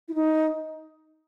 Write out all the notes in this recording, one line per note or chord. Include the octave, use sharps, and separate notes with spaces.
E4
D#4